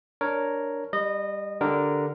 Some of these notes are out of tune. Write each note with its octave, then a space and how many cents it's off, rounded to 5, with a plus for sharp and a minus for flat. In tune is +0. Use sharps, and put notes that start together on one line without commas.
D4 -5 A#4 +0 C#5 +0
G3 +15 D#5 -20
D3 +0 G4 +0 A#4 +0